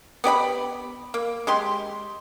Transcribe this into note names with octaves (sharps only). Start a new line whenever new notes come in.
B3 G4 D5 B5
A#3
G#3 G4 C6